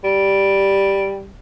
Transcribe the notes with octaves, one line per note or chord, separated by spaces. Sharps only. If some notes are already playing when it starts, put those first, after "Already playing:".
G3